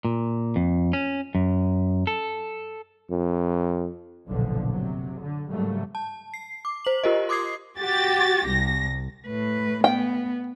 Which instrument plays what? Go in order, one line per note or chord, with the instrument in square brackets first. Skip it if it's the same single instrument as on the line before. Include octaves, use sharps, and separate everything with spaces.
[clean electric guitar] A#2
F2
C#4
F#2
A4
[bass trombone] F2
[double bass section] F#1 B1 A#2 D3 F3
C3 F#3
D3
G#2 C#3 F#3 G3 A3 A#3
[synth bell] A5
C7
D6
C5 F#7
F4 G4 A#4 C5 D#5
C6 D6 D#6 G#6 C7
[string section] F#4 G4 A6
C2 A#6
[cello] A2 B4
[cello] B3 [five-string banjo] G5